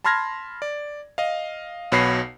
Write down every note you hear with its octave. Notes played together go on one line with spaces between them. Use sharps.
A5 B5 C6 F6 G#6 A#6
D5
D#5 F5
B1 B2 B4 C#5 B5 C7